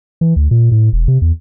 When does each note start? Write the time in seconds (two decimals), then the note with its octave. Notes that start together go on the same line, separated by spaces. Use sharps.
0.21 E3
0.36 D2
0.51 A#2
0.71 A2
0.93 E1
1.08 C3
1.22 E2